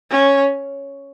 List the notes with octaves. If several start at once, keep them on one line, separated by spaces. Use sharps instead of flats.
C#4